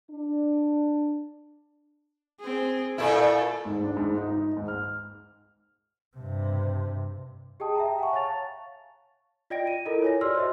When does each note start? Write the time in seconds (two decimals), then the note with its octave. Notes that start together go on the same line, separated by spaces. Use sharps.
0.11 D4
2.40 C4 G#4
2.98 A#2 E4 A4
3.65 G#2
3.84 D4
3.97 G#2
4.17 D#4
4.32 D#4
4.57 G#2
4.68 F6
6.17 G2 C3
7.60 G4 G#4 D#5 G5 A5 D#6
7.75 E5 G5 A5 A#5
7.99 F#5 G#5 A#5 C#6
8.13 C#5 F5 A5 C#6 A6 F7
9.50 F4 D5 D#5 G5 A#6 D7
9.67 D#7
9.85 E4 F4 A4 A#4 D#5
10.02 C#5 G#5 A#6
10.21 F#4 G4 D5 C6 E6 F6
10.35 C5 D#5 E5